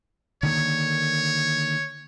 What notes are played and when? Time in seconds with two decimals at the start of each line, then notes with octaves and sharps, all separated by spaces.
0.43 D3 D#3 A#3 C#5